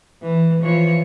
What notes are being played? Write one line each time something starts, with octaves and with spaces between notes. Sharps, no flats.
E3
E3 F3 C#5